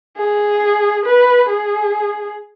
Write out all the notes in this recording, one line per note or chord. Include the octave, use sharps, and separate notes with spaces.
G#4
B4
G#4